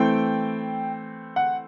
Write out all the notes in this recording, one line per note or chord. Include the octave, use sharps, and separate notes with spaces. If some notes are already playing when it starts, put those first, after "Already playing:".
Already playing: E3 A3 C4 G5
F#5